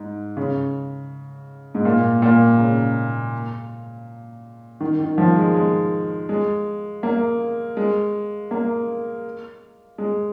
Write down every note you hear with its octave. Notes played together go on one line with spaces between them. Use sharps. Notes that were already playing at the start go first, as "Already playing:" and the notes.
Already playing: G#2
C#3
G#2
A#2
A#2
C#3
D#3
D#3
F3
G#3
G#3
G#3
A#3
G#3
A#3
G#3